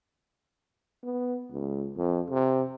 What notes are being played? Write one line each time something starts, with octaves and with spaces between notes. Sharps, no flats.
B3
C#2
F2
C3